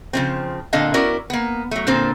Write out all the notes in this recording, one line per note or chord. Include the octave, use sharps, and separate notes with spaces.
C#3 F3 C4
A#2 D3 C4 D#5 F5 A5
B3 C#4 E4 F#4 A#4 D5
A#3 B3
F#3 A3
A#2 D3 A#3 C4 A4 C5